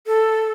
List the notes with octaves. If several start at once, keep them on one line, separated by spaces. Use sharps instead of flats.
A4